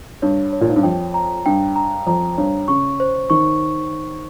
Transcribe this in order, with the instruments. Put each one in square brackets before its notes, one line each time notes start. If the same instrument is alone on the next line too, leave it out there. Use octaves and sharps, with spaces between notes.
[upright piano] G2 [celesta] C#5
[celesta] C#5
[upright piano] A#2
G#2
G2
[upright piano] F2 [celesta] G5
[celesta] A#5
[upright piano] G2 [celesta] G5
[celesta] A#5
[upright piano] F2 [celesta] A#5
[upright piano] G2 [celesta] C#5
[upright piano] C#3 [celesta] C#6
[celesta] C5
[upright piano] D#3 [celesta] C#6